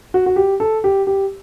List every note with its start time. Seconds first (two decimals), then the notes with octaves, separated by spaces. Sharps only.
0.14 F#4
0.26 F#4
0.36 G4
0.60 A4
0.84 G4
1.07 G4